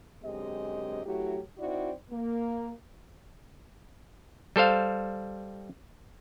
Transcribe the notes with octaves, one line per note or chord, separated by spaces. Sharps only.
F#2 D3 G#3 C4 G4 D#5
F#3 A3 E4 F#4 G4
C4 D#4 E4 F#4 D5
A#3
G3 A4 C5 F5